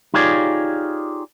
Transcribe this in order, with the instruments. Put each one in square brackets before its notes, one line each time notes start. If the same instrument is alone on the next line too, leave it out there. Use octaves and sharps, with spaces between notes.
[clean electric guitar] D#4 F4 G4 G#4 C#5 D5